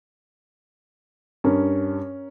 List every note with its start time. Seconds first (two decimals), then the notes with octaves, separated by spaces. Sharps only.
1.44 G2 C#4 A#4